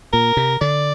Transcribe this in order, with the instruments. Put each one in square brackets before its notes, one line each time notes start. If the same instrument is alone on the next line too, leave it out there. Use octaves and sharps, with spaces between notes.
[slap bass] A#2 [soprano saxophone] A#4
[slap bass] C3
[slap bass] D3 [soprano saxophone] D5